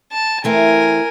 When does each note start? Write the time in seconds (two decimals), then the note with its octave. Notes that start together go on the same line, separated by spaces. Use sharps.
0.13 A5
0.44 E3 A3 C4 A#4 G#5